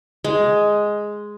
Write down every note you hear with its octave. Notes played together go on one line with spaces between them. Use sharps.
G#3